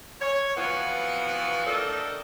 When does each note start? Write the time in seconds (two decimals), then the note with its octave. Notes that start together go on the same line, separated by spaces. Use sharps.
0.21 C#5
0.57 B2 E3 F3 B3 C4 F#4
1.66 A3 D4 A4 A#4 D#5 G5